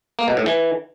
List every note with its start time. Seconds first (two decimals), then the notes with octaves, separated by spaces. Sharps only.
0.19 A#3
0.28 B2
0.37 A2
0.46 E3